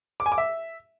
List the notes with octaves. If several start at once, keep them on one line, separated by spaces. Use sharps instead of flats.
D6
G#5
D6
E5